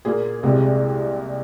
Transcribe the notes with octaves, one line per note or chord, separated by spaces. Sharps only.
A#2 A#3 G#4
C2 C3 G#3